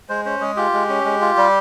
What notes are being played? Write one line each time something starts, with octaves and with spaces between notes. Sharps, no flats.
G#3 C5
C#4 C5
G#3 G#4
F4 G4
G#3
C#4
G#3
F4
G3